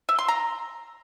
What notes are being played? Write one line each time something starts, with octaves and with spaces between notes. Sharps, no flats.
E5
C6
A#5